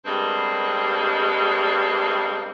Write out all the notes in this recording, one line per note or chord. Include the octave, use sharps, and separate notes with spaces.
G2 B2 G3 G#3 A#3 C4